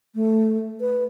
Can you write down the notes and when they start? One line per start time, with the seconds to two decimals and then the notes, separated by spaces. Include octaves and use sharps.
0.15 A3
0.81 B4